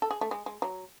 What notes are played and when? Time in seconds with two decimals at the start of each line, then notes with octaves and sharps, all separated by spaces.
0.02 A4
0.11 G#4
0.21 A3
0.31 G#3
0.46 G#3
0.62 F#3